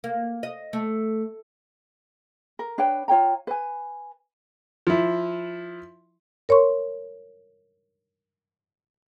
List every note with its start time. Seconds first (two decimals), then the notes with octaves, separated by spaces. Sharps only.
0.04 A#3
0.43 D#5
0.73 A3
2.59 A#4
2.78 D4 B4 C#5 G5
3.08 F4 C#5 G5 A#5
3.47 B4 G#5
4.87 F3 E4
6.49 A#4 C#5 C6 C#6